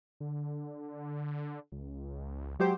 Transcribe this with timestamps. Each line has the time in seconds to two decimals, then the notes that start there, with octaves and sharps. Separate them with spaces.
0.20 D3
1.72 C#2
2.59 F#3 G#3 G4 C5